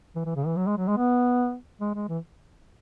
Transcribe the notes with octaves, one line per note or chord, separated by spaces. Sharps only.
E3
E3
C#3
E3
F#3
G#3
F#3
G#3
B3
G#3
G#3
E3